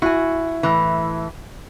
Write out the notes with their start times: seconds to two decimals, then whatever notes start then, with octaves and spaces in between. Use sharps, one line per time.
0.02 E4 F#4 G#5
0.63 A2 E3